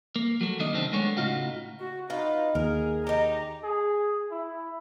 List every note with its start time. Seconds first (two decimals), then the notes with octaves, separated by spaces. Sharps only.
0.16 A#3
0.41 F#3 A3
0.59 D#3 F#3 A#3 D4 D#5
0.73 F#2 C3 D#3 C4 D4
0.93 G#3 A3 B3 D4 C#5
1.17 A2 C#3 D#4 F4 F#4
1.80 F#4
2.10 D#4 F4 B4
2.55 D#2 G#4 A#4
3.07 D#4 G4 A#5
3.64 G#4
4.31 E4